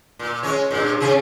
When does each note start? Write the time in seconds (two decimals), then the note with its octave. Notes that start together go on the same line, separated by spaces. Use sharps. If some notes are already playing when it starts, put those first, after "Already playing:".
0.19 A#2
0.43 G#3 C#4 C#5
0.71 G2 A#2
1.00 C3 G#4